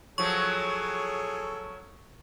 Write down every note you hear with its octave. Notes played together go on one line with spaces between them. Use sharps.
F3 F#3 G#4 A4 C#5 C#6